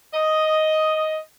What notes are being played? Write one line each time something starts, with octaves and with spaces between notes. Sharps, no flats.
D#5